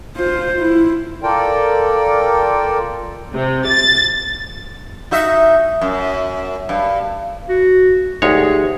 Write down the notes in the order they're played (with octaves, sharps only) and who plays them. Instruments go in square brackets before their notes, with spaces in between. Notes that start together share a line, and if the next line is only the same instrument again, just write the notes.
[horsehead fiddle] F4 C5
E4
[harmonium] F4 A4 A#4 D5 G5
[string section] C3
A6
[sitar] D#4 F#4 E5
F#2
G2
[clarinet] F#4
[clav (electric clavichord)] D2 G#3 C#5 [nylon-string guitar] D#4 G4 [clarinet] G#4